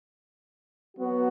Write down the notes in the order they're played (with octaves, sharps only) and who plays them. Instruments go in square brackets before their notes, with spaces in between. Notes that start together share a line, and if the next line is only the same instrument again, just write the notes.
[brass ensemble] F#3 B3 F#4